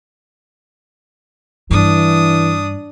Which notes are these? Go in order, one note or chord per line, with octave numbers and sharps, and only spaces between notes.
G2 E3 D4 D#6